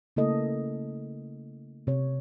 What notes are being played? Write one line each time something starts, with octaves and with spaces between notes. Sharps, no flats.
C#3 A3 A#3 E4 A4 D#5
C3 C#5